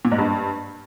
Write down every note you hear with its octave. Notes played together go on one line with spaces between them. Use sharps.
A#2
G#2
G2